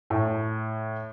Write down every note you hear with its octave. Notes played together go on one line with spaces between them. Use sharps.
A2